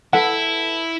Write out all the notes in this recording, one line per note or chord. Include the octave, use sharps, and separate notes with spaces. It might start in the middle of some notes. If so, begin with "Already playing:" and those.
E4 A4 B4 F#5